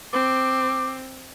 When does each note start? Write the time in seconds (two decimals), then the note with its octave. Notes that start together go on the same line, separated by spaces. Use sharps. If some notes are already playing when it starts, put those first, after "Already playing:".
0.13 C4 D6